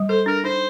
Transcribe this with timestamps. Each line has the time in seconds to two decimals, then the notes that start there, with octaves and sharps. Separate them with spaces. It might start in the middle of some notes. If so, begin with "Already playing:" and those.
Already playing: G3
0.09 A4 C5
0.26 D4 A#4
0.44 D#4 C5